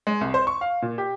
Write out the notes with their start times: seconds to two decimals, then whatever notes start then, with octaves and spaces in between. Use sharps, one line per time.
0.07 G#3
0.21 C2
0.34 C5
0.47 C#6
0.61 F5
0.82 A#2
0.98 G4